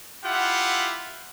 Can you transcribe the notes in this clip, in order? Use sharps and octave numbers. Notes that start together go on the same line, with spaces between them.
E4 F4 G4 F#5